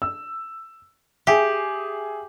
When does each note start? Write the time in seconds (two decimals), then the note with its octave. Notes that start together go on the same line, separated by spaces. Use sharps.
0.02 E6
1.27 G4 G#4 E5